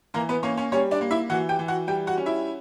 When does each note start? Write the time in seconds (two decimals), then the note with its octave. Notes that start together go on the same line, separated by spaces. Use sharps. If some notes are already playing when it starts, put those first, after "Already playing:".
0.14 E3 A#3 A#4
0.29 B3 B4
0.43 A#3 C#4 C#5
0.57 C#4 C#5
0.72 G3 C#4 C#5
0.91 D4 D5
1.01 A#3
1.11 E4 E5
1.30 E3 F#4 F#5
1.49 G4 G5
1.59 E3
1.68 F#4 F#5
1.87 G3 G4 G5
2.07 F#4 F#5
2.17 C#4
2.26 E4 E5